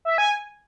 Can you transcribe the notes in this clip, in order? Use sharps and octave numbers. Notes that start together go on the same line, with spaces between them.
E5
G#5